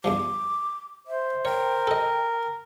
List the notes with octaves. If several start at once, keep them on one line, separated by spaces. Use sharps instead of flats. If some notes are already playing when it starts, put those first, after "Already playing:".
E2 G2 F3 D6
C5 E5
A#4 C#5 G5
A4 D#5